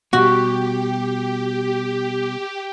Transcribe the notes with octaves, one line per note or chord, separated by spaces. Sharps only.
B2 G3 F#4 G4